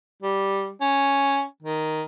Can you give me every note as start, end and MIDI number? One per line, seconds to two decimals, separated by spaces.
0.22 0.70 55
0.81 1.43 61
1.62 2.02 51